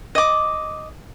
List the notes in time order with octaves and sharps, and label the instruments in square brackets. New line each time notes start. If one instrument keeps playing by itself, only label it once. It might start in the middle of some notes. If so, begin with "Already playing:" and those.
[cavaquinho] D#5 D6